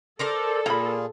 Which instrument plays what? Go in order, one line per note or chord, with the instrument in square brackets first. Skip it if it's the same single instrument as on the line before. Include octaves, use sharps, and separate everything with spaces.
[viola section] A4 [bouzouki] A#4 C5 D5
[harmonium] A#2 F4 G#4 [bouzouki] A#3 [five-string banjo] A#5 B5